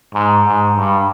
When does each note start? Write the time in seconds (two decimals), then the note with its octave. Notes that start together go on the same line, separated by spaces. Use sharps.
0.14 G#2
0.45 G#2
0.76 G2